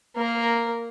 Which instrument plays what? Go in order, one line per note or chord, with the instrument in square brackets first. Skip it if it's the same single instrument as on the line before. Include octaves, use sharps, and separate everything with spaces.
[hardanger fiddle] A#3 A#4